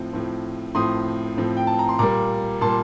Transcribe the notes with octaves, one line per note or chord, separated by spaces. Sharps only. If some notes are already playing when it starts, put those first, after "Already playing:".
Already playing: A2 F3 C4
A2 F3 C4
A2 F3 C4 C6 D#6
A2 F3 C4
G5
A5
A#5
C6
A#2 G3 A#3 A#5 D6
A#2 G3 A#3 A5 C6